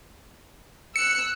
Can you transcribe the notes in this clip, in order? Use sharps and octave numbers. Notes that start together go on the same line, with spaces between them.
E6 F#6 C#7